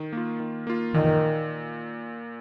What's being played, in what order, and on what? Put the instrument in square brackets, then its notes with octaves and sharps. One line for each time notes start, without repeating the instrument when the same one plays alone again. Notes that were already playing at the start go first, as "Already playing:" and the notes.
Already playing: [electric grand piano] D#3
A#3 F4
D#3
A#3 F4
[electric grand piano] A#2 [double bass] D#3